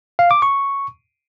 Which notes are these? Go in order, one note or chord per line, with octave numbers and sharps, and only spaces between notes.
F5
D6
C#6